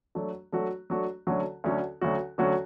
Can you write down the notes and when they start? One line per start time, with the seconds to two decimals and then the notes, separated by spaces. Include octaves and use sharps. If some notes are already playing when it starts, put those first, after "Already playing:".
0.15 F#3 A3 D4 F#4
0.52 F#3 A3 D4 F#4
0.90 F#3 A3 D4 F#4
1.27 D2 D3 F#3 C#4 F#4
1.64 D2 D3 F#3 C#4 F#4
2.01 D2 D3 F#3 C#4 F#4
2.38 D2 D3 F#3 C#4 F#4